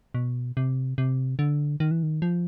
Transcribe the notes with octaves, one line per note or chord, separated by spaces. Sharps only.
B2
C3
C3
D3
D#3
E3
D#3
F3